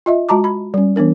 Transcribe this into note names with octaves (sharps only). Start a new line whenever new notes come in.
F4 D#5 E5
G#3 F#4 A5 A#5 D6
B5
G3 C#4
E3 B3 D4 A#4